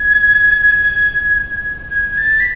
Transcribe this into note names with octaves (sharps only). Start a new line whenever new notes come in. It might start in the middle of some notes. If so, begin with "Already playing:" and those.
Already playing: G#6
G#6
G#6
A6
B6